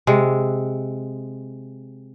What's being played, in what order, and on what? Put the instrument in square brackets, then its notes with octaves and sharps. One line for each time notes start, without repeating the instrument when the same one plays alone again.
[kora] C3 G#3